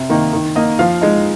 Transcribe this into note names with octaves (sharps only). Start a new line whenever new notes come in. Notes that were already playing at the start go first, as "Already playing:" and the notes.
Already playing: C3
D#3 A#3 D#4
D#3
A#3 D#4 D#5
F3 F5
G#3 D#4